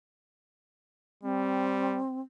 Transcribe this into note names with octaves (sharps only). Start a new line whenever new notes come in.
G3 C4